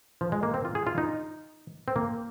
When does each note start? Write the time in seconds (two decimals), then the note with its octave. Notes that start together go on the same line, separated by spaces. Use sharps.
0.21 F3
0.32 G#3
0.43 A#3
0.54 C4
0.65 F4
0.75 G#4
0.87 F4
0.98 D#4
1.88 C4
1.96 A#3